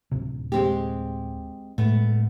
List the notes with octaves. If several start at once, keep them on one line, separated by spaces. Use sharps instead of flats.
D1 C3
G#3 C4 G4
A2 G#3 A3 B3